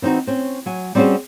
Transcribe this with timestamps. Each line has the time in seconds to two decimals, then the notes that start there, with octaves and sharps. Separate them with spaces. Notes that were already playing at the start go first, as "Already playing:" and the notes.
0.02 E3 C4 C#4 D#4 F#4
0.27 C4 C#4
0.66 F#3 G#5
0.95 G3 C4 C#4 F#4 G#4 C5